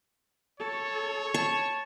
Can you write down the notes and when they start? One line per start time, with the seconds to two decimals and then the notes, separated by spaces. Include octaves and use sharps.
0.60 A4 C#5
1.34 A5 C#6